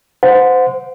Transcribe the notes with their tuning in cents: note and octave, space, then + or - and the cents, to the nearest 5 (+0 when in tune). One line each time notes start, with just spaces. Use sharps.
C5 -25 F#5 -25